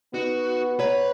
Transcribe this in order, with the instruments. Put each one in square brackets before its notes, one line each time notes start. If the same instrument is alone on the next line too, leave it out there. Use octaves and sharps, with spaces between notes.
[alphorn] B3 [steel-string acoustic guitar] D#4 [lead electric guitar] F#4
[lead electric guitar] B4 [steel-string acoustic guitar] C#5 A#5